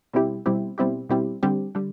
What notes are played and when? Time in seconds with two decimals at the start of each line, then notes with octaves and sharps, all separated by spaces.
0.13 B2 G3 C4 E4 G4
0.46 B2 G3 C4 E4 G4
0.78 B2 G3 C4 E4 G4
1.09 B2 G3 C4 E4 G4
1.43 D3 G3 C4 G4
1.75 D3 G3